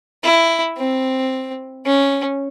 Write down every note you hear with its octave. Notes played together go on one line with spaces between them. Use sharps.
E4
C4
C#4